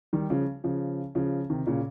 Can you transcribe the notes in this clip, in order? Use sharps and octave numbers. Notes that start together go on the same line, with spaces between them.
D#3 G3
C#3 F3
C#3 F3
C#3 F3
C3 D#3
A#2 C#3